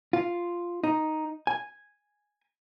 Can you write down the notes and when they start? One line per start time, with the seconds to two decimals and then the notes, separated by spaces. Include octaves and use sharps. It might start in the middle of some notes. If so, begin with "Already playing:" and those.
0.13 F4
0.84 D#4
1.47 G#5